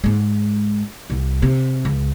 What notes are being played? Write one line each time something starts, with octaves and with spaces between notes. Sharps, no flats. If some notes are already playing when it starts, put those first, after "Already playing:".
G#2 G#3
C2
C3
C#2